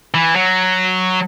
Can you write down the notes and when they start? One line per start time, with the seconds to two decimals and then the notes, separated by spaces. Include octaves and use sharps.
0.14 E3
0.35 F#3